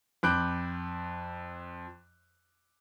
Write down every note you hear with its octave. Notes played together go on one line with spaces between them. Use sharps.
F2 B5 D6 F#6 G6 D7